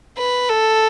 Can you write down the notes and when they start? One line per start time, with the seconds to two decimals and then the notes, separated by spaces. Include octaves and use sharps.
0.18 B4
0.50 A4